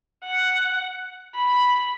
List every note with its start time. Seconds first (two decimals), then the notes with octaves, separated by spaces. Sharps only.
0.25 F#5
1.35 B5